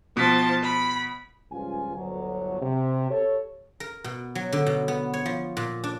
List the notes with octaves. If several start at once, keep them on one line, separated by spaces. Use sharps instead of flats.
B2 F3 A5 B6
B5
C#2 G2 F3 F4 G#5
G1 D2 F#3
C3
G4 A4 C#5
A#4
B2
F#3
D3
B2
B3
C#5
F3
A#2
D4